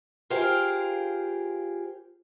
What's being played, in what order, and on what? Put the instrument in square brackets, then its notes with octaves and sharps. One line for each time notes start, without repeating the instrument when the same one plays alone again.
[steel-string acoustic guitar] F4 G4 G#4 A#4 C5 F5